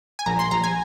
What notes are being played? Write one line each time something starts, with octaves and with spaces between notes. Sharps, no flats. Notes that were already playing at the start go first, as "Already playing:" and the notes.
G#5
A#1 A#5
C6
A#1 A#5
G#5